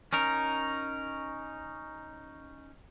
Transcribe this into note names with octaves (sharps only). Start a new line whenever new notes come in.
C#4 D#4 A#4